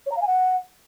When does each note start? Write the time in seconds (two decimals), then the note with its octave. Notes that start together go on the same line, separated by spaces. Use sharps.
0.06 C#5
0.11 A#5
0.17 F5
0.22 G#5
0.27 F#5